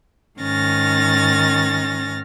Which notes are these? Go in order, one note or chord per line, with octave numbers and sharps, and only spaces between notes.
G#2 D#3 C#4 F6 A6 A#6